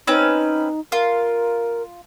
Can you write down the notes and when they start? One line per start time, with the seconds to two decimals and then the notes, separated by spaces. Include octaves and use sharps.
0.07 C4 C#4 D#4 B4
0.92 F4 A#4